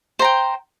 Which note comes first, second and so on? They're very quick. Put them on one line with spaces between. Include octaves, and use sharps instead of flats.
C5 A#5 G5